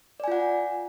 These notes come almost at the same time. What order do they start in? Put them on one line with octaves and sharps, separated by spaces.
D5 G#5 F4 F#5